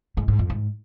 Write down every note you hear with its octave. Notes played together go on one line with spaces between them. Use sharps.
G#2
G#2
F2
G#2